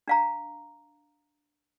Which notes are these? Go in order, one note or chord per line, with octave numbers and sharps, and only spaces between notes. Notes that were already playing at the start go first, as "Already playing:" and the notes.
D4 F5 A#5